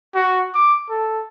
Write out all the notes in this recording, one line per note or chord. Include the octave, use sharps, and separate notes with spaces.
F#4
D6
A4